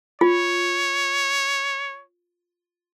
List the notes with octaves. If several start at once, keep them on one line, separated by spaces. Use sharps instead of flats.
F4 C#5